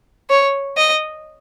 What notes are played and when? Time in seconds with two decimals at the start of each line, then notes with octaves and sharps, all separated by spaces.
0.29 C#5
0.77 D#5